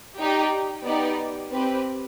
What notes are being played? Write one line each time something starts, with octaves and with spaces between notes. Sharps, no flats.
D#4 G4 D5 G5
B3 D#4 G4 D5
C4 G4 B4